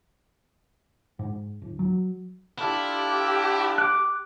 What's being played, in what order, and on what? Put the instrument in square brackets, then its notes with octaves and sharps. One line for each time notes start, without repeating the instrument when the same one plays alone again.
[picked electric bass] G#2
D1
F#3
[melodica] D4 F4 A4 [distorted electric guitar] E4 [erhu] G4
[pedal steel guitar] D6 F#6